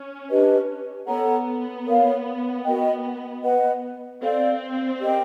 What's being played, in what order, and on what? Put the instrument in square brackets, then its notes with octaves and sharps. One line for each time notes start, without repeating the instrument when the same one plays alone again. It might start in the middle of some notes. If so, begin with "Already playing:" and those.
Already playing: [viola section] C#4
[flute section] D4 G4 B4 D#5
[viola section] B3 [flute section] A4 C#5 F#5 A#5
[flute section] A#4 C#5 F5
F#4 A#4 D#5 G5
B4 D#5 F#5
[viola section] C4 [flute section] A4 D5 F5
[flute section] G4 A#4 D#5 G5